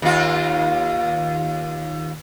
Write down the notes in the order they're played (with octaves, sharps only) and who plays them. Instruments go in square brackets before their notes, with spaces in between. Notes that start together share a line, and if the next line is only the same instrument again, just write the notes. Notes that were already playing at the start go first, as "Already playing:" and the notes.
[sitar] D#2 F4